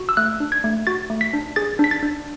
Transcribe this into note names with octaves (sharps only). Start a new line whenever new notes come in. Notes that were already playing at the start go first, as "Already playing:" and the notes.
Already playing: F#4
E6
A3 F#6
D4
G#6
A3
F#4 A6
A3
B6
D4
G#4 A6
D4 B6
A6
D4